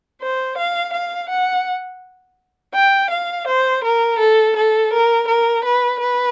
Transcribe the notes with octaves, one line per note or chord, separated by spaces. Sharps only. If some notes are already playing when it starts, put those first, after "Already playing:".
C5
F5
F5
F#5
G5
F5
C5
A#4
A4
A4
A#4
A#4
B4
B4